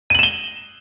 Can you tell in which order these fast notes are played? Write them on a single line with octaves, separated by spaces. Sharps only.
D#7 F#7 E7 G7